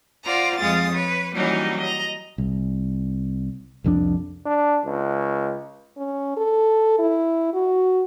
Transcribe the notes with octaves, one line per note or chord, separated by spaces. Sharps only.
F4 C5 D5 F#5 A#5
F2 G#3 F5 D#6 A6
B4 C#5
E3 F#3 G3 A#3 C#4 D#4
D#5 A#5
C2
C2 F2 E3 D4
D4
C#2
C#4
A4
E4
F#4